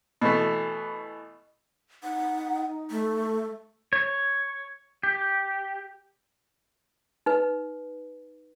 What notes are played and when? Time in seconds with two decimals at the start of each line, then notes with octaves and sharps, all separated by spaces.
0.21 B2 E3 A3
2.03 D#4 F#5
2.91 A3
3.93 C#5
5.03 G4
7.26 D#4 B4